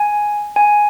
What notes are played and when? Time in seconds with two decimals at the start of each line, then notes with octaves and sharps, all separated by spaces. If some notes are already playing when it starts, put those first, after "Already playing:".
Already playing: G#5
0.56 G#5